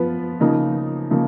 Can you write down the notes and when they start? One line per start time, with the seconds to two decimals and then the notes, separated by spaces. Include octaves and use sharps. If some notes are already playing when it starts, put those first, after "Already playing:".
Already playing: F3 B3 F4 B4
0.40 C#3 F3 A#3 D#4
1.11 C#3 F3 A#3